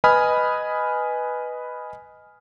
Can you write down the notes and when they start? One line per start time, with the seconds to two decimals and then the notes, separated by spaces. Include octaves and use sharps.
0.04 B4 D#5 G#5 B5 D#6 F6